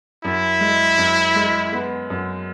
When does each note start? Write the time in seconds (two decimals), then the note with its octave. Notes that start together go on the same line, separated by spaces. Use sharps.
0.24 F#2 E4
0.61 G#3
0.98 F#2
1.35 G#3
1.72 B3
2.10 F#2